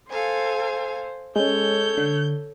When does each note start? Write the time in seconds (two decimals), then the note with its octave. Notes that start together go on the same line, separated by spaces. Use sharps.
0.10 A4 C5 F5 G#5
1.36 G#3 C#4 A4 C#5 G6
1.98 D3